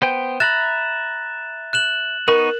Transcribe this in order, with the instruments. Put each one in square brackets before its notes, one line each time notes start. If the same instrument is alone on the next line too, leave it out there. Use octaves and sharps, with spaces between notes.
[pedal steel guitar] B3 C5 G5
[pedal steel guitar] E5 A#5 B5 [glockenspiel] F#6 A6
[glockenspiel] F#6 E7 F#7
[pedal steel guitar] B3 D#4 C#6 [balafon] A#4